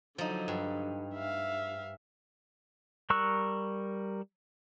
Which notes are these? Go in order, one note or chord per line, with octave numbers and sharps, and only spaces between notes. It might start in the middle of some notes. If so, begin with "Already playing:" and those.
D3 F3 F#3 D#4
G2
E5 F5
G3 A#4 C#6 E6 F#6